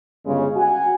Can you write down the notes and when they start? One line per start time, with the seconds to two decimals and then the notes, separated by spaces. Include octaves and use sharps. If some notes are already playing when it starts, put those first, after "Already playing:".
0.25 G1 C#3 G#3
0.56 F#4 F#5 G#5